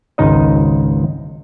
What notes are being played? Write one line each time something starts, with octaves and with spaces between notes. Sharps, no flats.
G#1 C#2 D#4 D#5